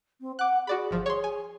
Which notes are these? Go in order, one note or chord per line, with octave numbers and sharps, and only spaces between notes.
C4
F#5 D6 F#6
F#4 G#4 D5 B5
G1 F3
G#4 C#5 C6
G#5